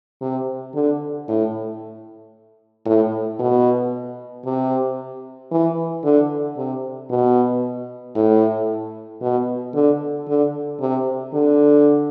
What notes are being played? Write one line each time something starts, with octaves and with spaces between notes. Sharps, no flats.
C3
D3
A2
A2
B2
C3
E3
D3
C3
B2
A2
B2
D3
D3
C3
D3